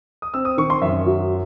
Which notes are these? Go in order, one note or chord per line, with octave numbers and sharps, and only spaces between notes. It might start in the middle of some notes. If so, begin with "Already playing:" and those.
D#6
C4 E6
D#6
D#3 C#6
C6
F#2 E5
F#3